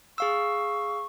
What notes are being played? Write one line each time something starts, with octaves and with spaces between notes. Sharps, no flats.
G#4 F5 C#6 E6